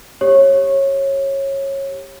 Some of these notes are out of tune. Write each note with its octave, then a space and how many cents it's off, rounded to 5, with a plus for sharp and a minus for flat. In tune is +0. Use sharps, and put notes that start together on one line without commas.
G4 +0 C#5 -20